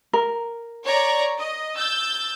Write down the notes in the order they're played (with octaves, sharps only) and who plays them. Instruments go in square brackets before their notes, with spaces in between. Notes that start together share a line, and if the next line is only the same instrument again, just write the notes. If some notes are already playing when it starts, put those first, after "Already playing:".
[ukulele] A#4
[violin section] C#5 D5 A#5
D#5
E6 G6 A6